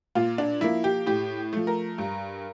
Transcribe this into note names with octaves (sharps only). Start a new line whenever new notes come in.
A#2 F4
D4
F3 A#3 E4
G4
A2 G4
F3 A3
A#4
G2